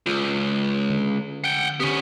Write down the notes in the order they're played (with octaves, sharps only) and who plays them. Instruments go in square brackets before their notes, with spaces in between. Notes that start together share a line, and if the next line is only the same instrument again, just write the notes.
[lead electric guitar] C#2 [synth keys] F4
[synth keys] D3
[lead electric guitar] F#5 G5
[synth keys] D3 G4 [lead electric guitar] B3 C#4